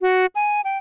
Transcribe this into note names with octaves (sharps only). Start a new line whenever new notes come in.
F#4
G#5
G5